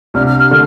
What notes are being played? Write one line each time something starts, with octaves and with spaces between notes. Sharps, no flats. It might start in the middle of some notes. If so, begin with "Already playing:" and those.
C2 C3 G3 D4 F6
F6
F6
D3 A3